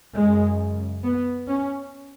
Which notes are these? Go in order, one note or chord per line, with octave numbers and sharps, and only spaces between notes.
F#2 C#3 G#3
B3
C#4